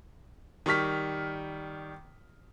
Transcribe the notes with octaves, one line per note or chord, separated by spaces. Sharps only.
D#3 G3 C#6 F6 B6